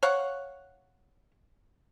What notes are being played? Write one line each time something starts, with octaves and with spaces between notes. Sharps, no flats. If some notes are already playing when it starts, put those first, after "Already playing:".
C#5 F5 F#5